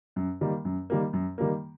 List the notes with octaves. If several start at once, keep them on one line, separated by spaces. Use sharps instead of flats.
F#2
D#3 G3 A#3
F#2
D#3 G3 A#3
F#2
D#3 G3 A#3